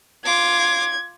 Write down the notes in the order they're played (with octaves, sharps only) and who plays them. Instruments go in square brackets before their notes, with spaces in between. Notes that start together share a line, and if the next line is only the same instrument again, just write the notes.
[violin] F4 D6 [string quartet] G#6